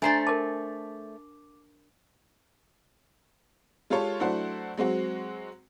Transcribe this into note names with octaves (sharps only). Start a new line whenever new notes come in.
A3 D4 C5 D5 E5 G#5 A#5 C7
A#4 A5 D6
G#3 F4 G4 A4 C#5
F#3 A3 D4 E4 C5 F#5
F#3 G#3 C4 F#4